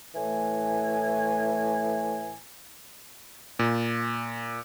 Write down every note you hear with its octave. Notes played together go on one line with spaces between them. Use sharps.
A2 E3 A3 G#5
A#2